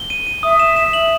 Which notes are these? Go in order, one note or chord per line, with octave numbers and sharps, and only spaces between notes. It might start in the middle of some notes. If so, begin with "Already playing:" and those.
Already playing: G7
D#7
D#7
E5 D#6
E7
E7
F#7